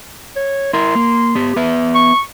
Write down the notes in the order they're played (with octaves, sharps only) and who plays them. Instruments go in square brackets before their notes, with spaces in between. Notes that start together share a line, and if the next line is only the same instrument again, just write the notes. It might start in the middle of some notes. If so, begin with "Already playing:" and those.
[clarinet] C#5
[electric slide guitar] E4 A#4 [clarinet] C6
[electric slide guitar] A#3
B3 G4
B3 B4 E5
[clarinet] C#6